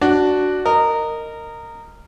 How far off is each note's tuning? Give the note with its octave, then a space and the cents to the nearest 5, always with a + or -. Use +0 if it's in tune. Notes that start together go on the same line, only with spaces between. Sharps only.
D4 +0 F#4 +5
A#4 -15 D#5 -10